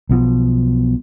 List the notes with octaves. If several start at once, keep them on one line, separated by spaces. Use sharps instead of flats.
B1 B2 F3